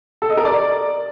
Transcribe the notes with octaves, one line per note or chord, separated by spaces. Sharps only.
A4
D#5
A#4
D5